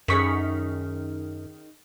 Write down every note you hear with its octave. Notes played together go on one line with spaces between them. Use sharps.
F#2 D#3 C#4 G#4 C#6 B6